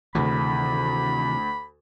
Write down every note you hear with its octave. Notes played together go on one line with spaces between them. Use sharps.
D2 C3 D#3 E3 B5